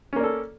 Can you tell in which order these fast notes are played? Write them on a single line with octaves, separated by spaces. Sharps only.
C#4 A#3 D5 A4